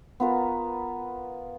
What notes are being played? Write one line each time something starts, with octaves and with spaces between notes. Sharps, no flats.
B3 F4 A#4 B4